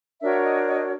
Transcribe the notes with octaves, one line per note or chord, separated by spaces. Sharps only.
D4 F#4 A#4 C#5 E5
D#5
D#5